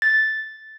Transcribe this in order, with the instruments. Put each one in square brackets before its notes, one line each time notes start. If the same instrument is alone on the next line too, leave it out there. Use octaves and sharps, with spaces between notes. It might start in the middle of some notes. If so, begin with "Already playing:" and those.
[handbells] A6